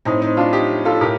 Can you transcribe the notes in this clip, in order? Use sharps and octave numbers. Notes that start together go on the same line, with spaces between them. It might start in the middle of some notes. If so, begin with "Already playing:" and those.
A2 C4 D#4
C4 D#4
D4 F4
D#4 G4
F4 A4
A2 G4 A#4